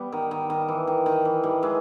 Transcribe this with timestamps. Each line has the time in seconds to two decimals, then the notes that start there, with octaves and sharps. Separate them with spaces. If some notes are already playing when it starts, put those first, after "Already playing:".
Already playing: G3 B3
0.12 D#3
0.31 D#3
0.50 D#3
0.68 E3
0.87 D#3
1.06 D#3
1.25 E3
1.43 D#3 G3
1.63 E3 G#3